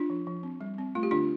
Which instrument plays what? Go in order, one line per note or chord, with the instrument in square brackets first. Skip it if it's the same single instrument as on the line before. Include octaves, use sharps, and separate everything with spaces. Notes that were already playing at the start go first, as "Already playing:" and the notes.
Already playing: [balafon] D4 F4
F3
F3
C4
G3
C4
A3 F4
G4
D3 D4 F4